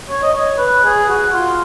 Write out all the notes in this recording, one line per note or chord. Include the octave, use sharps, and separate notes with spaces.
C#5
D#5
C#5
B4
G#4
F#4
F4